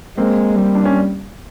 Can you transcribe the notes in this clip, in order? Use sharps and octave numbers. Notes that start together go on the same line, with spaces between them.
G#3 A#3 C4
G3
D4
C#4